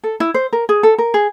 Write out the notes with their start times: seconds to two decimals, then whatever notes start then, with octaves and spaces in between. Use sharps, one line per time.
0.04 A4
0.20 E4
0.34 C5
0.53 A#4
0.69 G#4
0.83 A4
0.98 A#4
1.14 G#4